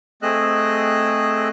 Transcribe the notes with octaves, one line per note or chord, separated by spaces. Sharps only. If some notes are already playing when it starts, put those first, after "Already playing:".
A3 C4 G#4 D#5 E6 F#6